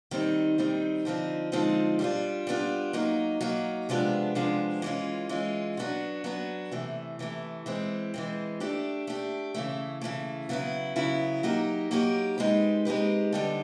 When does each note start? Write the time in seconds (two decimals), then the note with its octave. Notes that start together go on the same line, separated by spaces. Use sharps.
0.11 D#3 G3 C4 D#4
0.58 D#3 G3 C4 D#4
1.05 D3 F3 G#3 C4 D#4
1.52 D3 F3 G#3 C4 D#4
1.99 G3 B3 D4 F4
2.47 G3 B3 D4 F4
2.93 F#3 A#3 D#4
3.41 F#3 A#3 D#4
3.89 C3 F3 G#3 B3 D4
4.35 C3 F3 G#3 B3 D4
4.82 E3 G#3 C#4 F4
5.29 E3 G#3 C#4 F4
5.77 F#3 B3 D4 F#4
6.24 F#3 B3 D4 F#4
6.72 C3 E3 A3
7.19 C3 E3 A3
7.66 E3 G#3 C4
8.14 E3 G#3 C4
8.60 A3 D4 G4
9.07 A3 D4 G4
9.54 C#3 E3 A3
10.01 C#3 E3 A3
10.49 C#3 F#3 B3 E4
10.96 C#3 F#3 B3 E4
11.43 F#3 A#3 D#4 G4 A#4
11.91 F#3 A#3 D#4 G4 A#4
12.38 G#3 C4 D#4 G4 B4
12.85 G#3 C4 D#4 G4 B4
13.33 D3 G3 B3 D#4